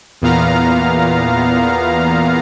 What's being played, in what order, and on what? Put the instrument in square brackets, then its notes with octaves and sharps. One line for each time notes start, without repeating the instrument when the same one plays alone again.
[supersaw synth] E2 A#2 B3 F5 A#5